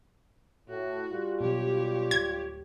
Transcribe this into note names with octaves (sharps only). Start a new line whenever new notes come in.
A2 F#4
G3 F4
B2 F#3 G4 C#5
D1 G#6